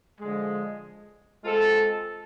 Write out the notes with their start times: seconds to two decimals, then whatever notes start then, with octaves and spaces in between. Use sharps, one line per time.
0.21 D3 F3 G#3
1.43 G#3 C4 F4 A4